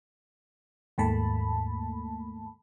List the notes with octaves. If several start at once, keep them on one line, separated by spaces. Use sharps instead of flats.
D#2 G#2 A3 A#3 A5 B5